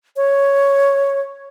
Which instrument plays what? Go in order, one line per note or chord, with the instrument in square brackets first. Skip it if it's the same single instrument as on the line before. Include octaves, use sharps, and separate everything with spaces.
[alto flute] C#5